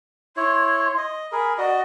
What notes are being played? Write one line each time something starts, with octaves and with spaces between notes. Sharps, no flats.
E4 C#5 C6
D#5
G#4 A#4 B5
F#4 D5 D#5